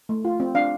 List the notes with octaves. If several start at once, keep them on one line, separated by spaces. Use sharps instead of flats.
A3
F4
C4
D4 F5